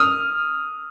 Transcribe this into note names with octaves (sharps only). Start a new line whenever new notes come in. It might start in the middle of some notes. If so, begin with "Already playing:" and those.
Already playing: D#6 F6